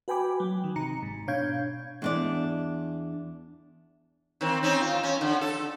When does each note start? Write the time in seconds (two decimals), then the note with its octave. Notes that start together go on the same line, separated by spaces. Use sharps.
0.08 F#4 B4 G5 G#5 B5 D6
0.40 F#3
0.64 D#3
0.75 G1 C3 D#4 A#5 C#7
1.03 G#2
1.28 B2 D4 C#5 F5 G6 G#6
2.02 E2 D4 D5
4.41 D#3 C4
4.63 C4 C#4 D#4
4.81 F4
5.03 C#4
5.21 D3
5.41 A4